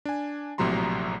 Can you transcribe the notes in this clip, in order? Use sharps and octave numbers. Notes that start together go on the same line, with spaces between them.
D4 G#5
A#1 A2 C3 F#3 A#5 C6